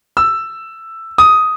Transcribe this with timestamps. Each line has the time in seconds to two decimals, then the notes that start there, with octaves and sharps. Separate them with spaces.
0.17 E6
1.18 D#6